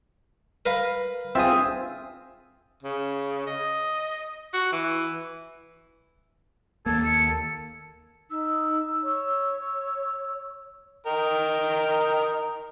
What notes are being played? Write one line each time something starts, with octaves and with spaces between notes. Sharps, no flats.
A#4 B4 F5
C4 F4 G#4 E5 D#6
C#3
D#5
F#4
E3
D#2 A#3 A4 G#6
C#7
D#4 E6
C#5
A#4 D#5 G5